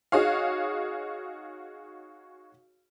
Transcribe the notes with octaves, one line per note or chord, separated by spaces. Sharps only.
D#4 F#4 G#4 C#5 F5